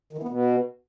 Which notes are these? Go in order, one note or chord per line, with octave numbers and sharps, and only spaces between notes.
D#3
E3
B3
B2